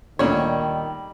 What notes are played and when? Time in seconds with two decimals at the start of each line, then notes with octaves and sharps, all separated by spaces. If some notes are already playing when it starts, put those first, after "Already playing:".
0.19 D2 A#2 D#3 G3 C#5